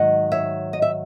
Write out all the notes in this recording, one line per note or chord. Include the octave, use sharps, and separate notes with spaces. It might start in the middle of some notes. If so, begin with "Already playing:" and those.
Already playing: G#2 D#3 F#3 D#5 F#5
C#5 E5
D#5
E5